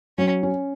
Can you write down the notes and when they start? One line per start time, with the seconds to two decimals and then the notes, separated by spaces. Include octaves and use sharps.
0.18 F#3 C#4
0.43 C#4